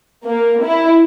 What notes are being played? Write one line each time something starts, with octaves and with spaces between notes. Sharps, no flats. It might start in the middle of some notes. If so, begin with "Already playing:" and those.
A#3
E4